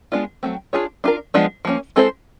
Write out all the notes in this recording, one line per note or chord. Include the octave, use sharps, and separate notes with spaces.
G#3 B3 D4 F4
F#3 A3 C4
D4 F4 G#4 C#5
D4 F4 A#4
F3 G#3 B3 D4
F3 A#3 C#4
G#3 C4 E4 A4 C5